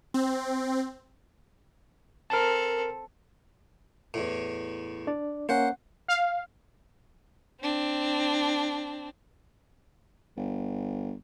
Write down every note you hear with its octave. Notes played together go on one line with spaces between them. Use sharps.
C4
C4 A4 A#4 A5
E2 A2
D4 D5
A#3 C#4 C5 F#5
F5
C4 D4
G1